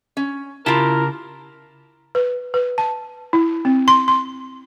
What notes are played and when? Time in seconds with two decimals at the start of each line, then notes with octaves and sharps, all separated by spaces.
0.17 C#4
0.66 C#3 E4 F4 G4 A#4 A5
2.15 B4
2.54 B4
2.78 A5
3.33 E4
3.65 C4
3.88 C6
4.08 C6